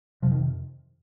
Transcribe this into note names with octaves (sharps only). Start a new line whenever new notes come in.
F2 C3 F3
D#3